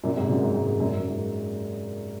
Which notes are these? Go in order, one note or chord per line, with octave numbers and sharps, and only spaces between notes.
F#2 A#2
G#2 C3
F#2 A#2
G#2
G#2
G#2
F#2 A#2
G#2
F#2
G#2